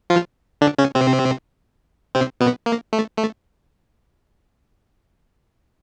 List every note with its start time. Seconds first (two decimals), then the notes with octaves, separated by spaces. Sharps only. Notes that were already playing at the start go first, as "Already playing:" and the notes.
0.10 F3 F4
0.61 D3 D4
0.78 C#3 C#4
0.95 C3 C4
2.15 C3 C4
2.40 B2 B3
2.66 A#3
2.93 A3
3.17 A3